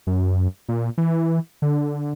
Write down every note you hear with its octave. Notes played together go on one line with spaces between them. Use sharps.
F#2
A#2
E3
D3